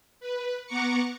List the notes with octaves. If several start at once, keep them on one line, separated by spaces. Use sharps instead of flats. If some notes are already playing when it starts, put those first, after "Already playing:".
B4
B3 F#5 A#5 C#6 D6 C#7